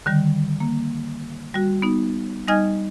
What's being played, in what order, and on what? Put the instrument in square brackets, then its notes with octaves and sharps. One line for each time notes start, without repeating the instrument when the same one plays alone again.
[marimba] D3 D#3 G3
A#3
G3 F#4
B3 D#4
G3 D#4 D#5 G#5 F6 G#6